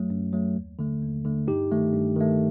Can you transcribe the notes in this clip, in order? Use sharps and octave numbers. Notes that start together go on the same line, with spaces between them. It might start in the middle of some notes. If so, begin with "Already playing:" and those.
Already playing: F#2 F#3 A3
F#2
F#3 A3
D#2
D3 A3
D#2
D3 A3
G2 D#4 G4
D#3 A3
G2
D#3 A3